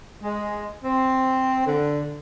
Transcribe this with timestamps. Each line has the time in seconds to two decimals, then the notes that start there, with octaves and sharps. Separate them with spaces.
0.22 G#3
0.84 C4
1.67 D3